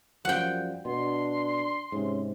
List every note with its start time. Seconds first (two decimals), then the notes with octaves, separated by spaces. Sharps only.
0.25 F#2 F3 G3 F#5 G5
0.85 B2 D4 C6
1.92 G#2 C3 C#4